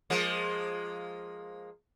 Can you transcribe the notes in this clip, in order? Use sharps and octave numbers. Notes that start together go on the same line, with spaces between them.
F3 G#3 A#3